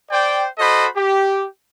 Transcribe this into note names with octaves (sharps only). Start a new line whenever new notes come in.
C5 D5 G5
F#4 A4 C5 D#5 B5
G4